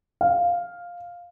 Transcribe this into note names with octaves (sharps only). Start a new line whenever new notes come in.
F5